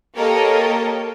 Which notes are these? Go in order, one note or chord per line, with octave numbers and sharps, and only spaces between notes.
A#3 G4 A4 A#4 C#5 D#5